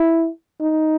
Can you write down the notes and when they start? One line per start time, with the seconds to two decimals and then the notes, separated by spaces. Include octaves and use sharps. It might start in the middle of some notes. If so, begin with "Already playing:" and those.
Already playing: E4
0.61 D#4